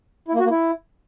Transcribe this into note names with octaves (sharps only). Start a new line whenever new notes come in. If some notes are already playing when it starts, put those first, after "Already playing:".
E4
A#3
F#4
A#3
E4